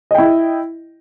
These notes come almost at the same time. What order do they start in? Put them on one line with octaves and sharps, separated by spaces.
D#5 G5 E4